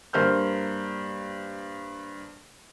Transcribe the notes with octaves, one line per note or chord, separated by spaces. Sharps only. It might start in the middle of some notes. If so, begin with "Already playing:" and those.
G2 A#3 C5 F6 G6